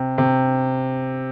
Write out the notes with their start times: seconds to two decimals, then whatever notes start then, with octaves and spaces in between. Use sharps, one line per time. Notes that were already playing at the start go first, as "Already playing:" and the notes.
Already playing: C3
0.18 C3